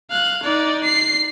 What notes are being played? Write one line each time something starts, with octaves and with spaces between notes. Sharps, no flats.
F5 F#6
D#4 D5
C7